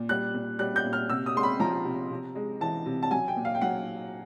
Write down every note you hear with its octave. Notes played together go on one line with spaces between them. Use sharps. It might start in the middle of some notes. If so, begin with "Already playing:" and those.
Already playing: A#2
G3 F#6
A#2
G3 F#6
G6
A#2
F6
C3 E6
D#6
G#3 C6
B5
F3 A#5
C3
C3
G#3
E3 A5
C3
A5
F#3 G#5
G5
A#2
F5
G5
F#3 F#5